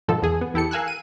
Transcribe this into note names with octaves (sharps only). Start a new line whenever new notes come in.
G#2 B2 D#3 F3 A4
E2 G#4
B3
E2 E4 G4 A4 C#7
A#4 F5 G#5 E6 F#6
D#7